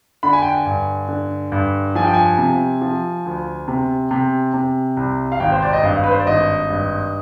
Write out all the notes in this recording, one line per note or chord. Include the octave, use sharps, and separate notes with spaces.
D3 B5
G#5
G5
G#5
G2
D3
G2
F3 G#5
G5
G#5
C3
F3
D2
C3
C3
C3
C2
F5
G#1 G5
C5
D5
D#5
G2 F5
B4
C5
D5
G#1 D#5
G2